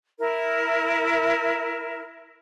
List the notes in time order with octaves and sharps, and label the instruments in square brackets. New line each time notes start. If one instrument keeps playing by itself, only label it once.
[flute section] E4 A#4